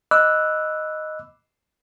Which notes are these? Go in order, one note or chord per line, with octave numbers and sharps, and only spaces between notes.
D#5 B5 D6 E6 F#6